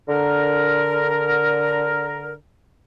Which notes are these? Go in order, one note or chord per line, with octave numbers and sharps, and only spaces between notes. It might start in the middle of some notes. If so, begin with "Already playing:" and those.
D3 A#4